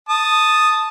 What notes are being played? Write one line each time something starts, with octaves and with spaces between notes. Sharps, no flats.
A5 D#6